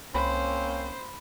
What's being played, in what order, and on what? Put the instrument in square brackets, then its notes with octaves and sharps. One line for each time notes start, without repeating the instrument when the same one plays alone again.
[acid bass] C2 [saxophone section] A#3 C4 C#4 [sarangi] C5 [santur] B5